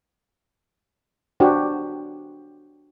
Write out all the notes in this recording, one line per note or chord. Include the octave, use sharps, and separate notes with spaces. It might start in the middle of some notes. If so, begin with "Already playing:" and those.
D4 F#4 G4 C5